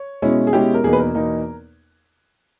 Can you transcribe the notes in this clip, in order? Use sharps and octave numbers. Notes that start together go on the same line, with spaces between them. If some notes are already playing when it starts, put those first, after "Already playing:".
Already playing: C#5
B2 G#3 C#4 E4
G#4
B2 G#3 C#4 E4 G4
A#4
E2 B2 A#3 D#4 G#4
B4
A#4
E2 B2 A#3 D#4